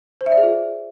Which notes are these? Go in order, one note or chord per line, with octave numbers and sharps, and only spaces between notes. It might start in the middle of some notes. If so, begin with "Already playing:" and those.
C5
E5
D5
G#4
F4